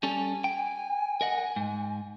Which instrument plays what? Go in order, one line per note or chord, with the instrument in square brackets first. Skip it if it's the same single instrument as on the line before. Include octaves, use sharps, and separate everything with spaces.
[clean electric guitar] G3 C#4 A4 [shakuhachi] G#5
[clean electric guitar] G5
A#4 D#5 F#5
G#2